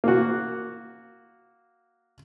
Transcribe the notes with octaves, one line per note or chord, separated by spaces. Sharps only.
A#3 F#4